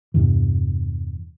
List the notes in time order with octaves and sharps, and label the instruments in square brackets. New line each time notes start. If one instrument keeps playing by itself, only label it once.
[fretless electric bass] E2 G2 C3 E3